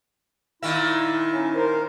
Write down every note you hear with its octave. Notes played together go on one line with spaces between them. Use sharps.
A#2 D#3 E4 E5
C#4
A#4 C5